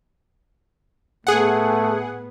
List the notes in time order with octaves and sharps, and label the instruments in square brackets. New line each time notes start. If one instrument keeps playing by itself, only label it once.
[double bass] A2 B3 [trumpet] A3 [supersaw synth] G#4 F#5